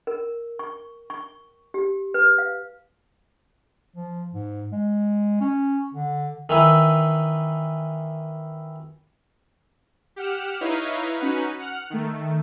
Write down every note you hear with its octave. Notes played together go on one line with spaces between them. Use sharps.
A#4
C#6
C#6
G4
B4
F5
F3
G#2
G#3
C#4
D3
D#3 E3 E4
G4 F#5 F6 E7
D#4 E4 B4 C#5 D#5 F5
C#4 D#4 F#4 B4
F#5 F6
D#3 A3